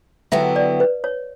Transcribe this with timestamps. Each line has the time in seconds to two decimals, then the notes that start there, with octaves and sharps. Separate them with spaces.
0.32 D3 F#3 B3 E4 G4 E5
0.56 D5
0.80 B4
1.04 C#5